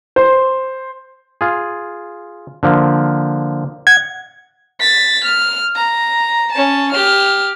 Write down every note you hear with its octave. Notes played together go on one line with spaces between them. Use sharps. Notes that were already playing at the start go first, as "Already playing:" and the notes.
C5
F4 G#4
D3 F3 A#3
F#5 G#6
A6 B6
F6
A#5
C#4 A5
G4 F6